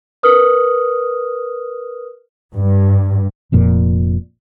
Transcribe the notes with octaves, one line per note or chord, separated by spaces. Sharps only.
A#4 B4 D#6 F6
G2
F1 F2 A#2